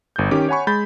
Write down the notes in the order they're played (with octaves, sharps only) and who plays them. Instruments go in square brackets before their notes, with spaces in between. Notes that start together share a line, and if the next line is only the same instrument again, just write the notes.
[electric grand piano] G1 G6
D#3 C#4 G4 D6
C#5 F#5 G#5 B5 C#6
G#3 B5 G6 A6